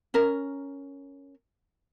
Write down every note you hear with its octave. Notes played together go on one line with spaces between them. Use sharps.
C#4 A#4